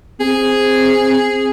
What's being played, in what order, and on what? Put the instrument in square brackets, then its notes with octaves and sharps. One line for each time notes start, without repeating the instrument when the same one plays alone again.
[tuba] C4 [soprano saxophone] G#4